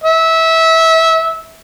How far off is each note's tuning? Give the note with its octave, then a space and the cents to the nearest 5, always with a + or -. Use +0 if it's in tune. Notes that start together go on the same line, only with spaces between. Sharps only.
E5 -20